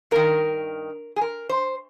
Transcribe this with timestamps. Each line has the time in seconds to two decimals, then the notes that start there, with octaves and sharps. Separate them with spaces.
0.11 G2 D#3 A#4
1.16 G#4
1.21 A#4
1.49 C5